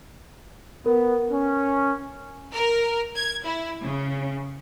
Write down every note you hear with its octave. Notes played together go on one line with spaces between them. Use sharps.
B3 A#4
C#4
A#4
G#6
E4
C#3